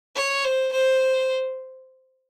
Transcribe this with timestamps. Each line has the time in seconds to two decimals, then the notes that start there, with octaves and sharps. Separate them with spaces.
0.16 C#5
0.45 C5
0.73 C5